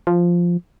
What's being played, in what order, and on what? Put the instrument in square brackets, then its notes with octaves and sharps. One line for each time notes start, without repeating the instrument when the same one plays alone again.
[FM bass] F3